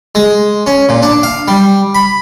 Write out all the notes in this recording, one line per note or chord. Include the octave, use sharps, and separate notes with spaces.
G#3
C#4
A#2
D4
F5
G3
B5